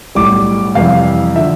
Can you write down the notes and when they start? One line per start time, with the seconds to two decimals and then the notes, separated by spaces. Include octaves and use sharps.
0.15 B1 A2 G3 D6
0.75 F2 C3 E3 G3 F5
1.36 D3 F3 E5